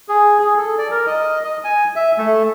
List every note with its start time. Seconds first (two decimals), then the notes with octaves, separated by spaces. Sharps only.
0.08 G#4
0.39 G#4
0.57 A4
0.78 D5
0.91 A#4
1.07 D#5
1.44 D#5
1.64 G#5
1.96 E5
2.18 A3